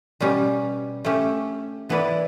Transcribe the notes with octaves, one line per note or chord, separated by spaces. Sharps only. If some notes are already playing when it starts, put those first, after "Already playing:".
B2 G3 C#4 G4
A3 C#4 G4
E3 B3 E4 B4 D5